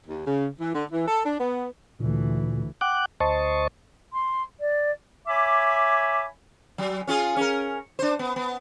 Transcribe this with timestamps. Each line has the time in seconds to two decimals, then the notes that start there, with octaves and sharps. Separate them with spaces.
0.07 D#2
0.27 C#3
0.61 E3
0.74 D3
0.92 E3
1.08 A4
1.26 D4
1.40 B3
2.00 D2 A#2 E3
2.81 F#5 G5 D6 F#6
3.20 D2 C5 D#5 A5 C#6
4.12 C6
4.59 D5
5.27 C#5 E5 G#5 B5 D6
6.78 F#3
7.07 C#4 F4 G#4
7.36 C#4 A#4
7.99 D4 C5
8.19 B3
8.36 B3